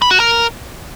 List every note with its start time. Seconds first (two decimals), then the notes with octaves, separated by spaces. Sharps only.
0.02 B5
0.11 F#4
0.20 A#4